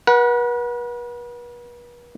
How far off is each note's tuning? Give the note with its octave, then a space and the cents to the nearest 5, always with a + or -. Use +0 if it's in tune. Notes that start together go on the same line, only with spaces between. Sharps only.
B4 -40 F#5 -5